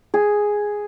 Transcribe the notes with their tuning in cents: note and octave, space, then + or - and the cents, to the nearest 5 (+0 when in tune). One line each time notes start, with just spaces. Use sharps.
G#4 +0